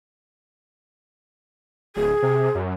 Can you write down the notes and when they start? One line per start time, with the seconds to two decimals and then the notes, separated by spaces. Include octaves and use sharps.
1.96 D1 G#4
2.23 C3
2.55 F#2